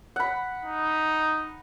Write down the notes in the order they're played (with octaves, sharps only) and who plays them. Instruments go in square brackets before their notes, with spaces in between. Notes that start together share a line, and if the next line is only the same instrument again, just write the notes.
[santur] F#5 B5
[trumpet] D#4